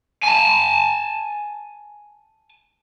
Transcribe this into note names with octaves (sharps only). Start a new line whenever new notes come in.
G#5 A5